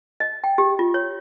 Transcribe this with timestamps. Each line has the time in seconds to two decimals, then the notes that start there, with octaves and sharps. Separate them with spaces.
0.20 D#5
0.44 G5
0.58 G4
0.79 F4
0.94 C#5